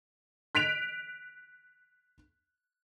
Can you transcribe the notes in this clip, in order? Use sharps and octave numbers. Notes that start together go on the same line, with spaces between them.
F#6 B6 D7 F7